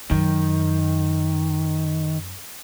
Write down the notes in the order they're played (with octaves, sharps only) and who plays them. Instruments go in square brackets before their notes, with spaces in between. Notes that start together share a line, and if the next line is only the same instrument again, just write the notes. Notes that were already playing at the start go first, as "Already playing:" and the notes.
[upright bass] F#2 [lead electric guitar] D#3